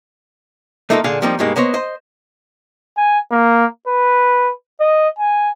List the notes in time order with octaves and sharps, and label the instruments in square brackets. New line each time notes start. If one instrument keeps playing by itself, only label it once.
[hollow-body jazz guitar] A3 A#3 D#4 F4 G#4 A4
A#2 D3 G#4 F5
F3 G3 A#3 C4 D#4
G2 B2 G#3 A#3 D#4
A#3 B3 C5 C#5 D#5
C5 D#5
[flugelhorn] G#5
A#3
B4
D#5
G#5